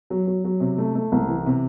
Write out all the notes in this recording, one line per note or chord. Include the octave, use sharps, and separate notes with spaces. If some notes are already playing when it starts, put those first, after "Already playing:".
F#3
F#3
F#3
C3
A3
A3
C2
E3
C3